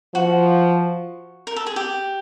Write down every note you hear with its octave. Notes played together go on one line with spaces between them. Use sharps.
F3 F#4
A#4
A4
G#4
G4